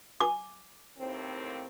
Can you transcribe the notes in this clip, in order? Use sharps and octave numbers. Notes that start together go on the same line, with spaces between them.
G#5 D6
D#2 A2 C4